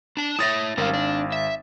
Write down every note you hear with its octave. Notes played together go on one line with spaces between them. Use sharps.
D4 A5
E4 C#5 E5 D#6 A6 A#6
G#1 G3 C#4 A#4 F5
D4
E5